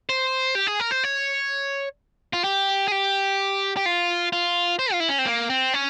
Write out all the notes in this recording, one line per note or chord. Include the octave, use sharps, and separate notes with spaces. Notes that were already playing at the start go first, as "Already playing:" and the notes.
C5
G4
G#4
A#4
C5
C#5
F4
G4
G#4
G4
G4
F4
F4
C5
F4
E4
C#4
C4
A#3
C4
C#4